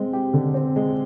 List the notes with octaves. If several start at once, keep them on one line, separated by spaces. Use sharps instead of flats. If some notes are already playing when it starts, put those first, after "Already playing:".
Already playing: G#3 C4
G4
D3
C4
G#3